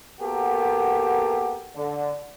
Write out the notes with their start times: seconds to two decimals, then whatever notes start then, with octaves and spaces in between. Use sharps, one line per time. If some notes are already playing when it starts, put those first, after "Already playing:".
0.21 A#3 B3 F#4 G4 A4 A#4
1.76 D3